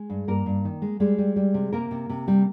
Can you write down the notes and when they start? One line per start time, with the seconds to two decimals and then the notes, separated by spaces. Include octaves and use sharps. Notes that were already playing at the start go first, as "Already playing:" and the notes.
Already playing: G#3 G#4
0.10 G2
0.28 G2 A#3 A#4
0.46 G2
0.65 D#3
0.82 G#3
1.00 G3 G#3 G#4
1.18 G3
1.36 G3
1.54 C3
1.72 C3 A#3 A#4
1.91 C3
2.09 C3
2.28 G3